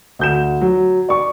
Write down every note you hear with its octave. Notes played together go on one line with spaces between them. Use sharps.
D2 G6 E7
F#3
D5 C#6